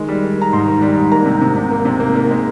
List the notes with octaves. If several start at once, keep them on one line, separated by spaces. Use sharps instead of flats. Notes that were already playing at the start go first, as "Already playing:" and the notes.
Already playing: D#3 G#3
G3
D#3
D#3 A#5
G#2 C6
D#3
G3
G#2
A#3 A#5
C3
C3
C3
A#3
C3
A#3
A#3
G#3